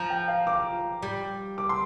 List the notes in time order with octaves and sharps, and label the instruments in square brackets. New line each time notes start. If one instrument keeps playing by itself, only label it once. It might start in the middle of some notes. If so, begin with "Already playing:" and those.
Already playing: [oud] F3 [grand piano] A#5
[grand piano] G5
F5
D6
[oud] G3
[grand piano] D6
C6